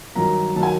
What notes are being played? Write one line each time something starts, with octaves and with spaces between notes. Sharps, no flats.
G2 D#3 F#3 A#3 A#5
D#3 F#3 A#3 A5
G#5